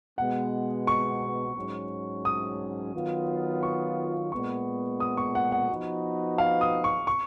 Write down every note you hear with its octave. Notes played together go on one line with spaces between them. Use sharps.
B2 G#3 B3 F#5
C#6
G#2 F#3 C#4
D#6
D#3 F#3 B3 F4
C#6
A#2 G#3 B3 C#6
D#6
C#6
F#5
F#5
F3 B3 D#4 F#4 B4
F5
D#6
C#6
C#6